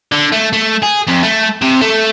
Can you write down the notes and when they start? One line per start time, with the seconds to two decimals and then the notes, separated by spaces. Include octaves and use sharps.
0.12 D3
0.32 A3
0.53 A3
0.83 G#4
1.08 F2
1.24 A3
1.62 C3
1.82 A3